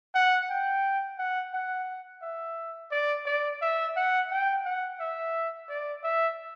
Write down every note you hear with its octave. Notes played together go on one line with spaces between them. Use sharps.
F#5
G5
F#5
F#5
E5
D5
D5
E5
F#5
G5
F#5
E5
D5
E5